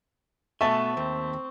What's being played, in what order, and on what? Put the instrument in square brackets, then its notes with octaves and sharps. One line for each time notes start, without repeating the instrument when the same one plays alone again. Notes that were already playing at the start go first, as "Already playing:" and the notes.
[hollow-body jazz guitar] B2 B3 G#5 [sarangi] A3 [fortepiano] E5 A5 [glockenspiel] C#6
[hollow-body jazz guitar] D#2 [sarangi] C4